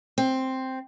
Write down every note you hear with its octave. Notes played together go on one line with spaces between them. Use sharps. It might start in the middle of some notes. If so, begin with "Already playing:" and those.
C4